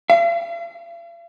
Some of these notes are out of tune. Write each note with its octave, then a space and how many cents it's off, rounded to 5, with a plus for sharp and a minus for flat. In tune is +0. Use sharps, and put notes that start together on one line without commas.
F5 -45